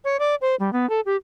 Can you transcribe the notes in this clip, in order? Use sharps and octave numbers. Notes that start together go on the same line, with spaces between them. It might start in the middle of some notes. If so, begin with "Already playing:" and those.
C#5
D5
C5
G3
B3
A4
G4